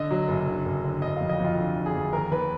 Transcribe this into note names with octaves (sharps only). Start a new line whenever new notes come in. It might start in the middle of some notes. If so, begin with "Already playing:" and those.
Already playing: D3 D#5
F#3
F#1
D3
F#1
D3
F#1 D#5
F2 F5
D#5
F2
F4
D3
D3
G#4
F2
D#2 A#4
D#2 B4